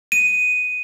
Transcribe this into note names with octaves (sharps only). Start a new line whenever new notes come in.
D#7